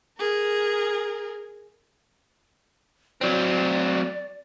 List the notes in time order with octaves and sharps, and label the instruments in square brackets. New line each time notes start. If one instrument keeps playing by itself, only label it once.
[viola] G#4 A#4
[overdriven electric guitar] F#3 C4 [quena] D5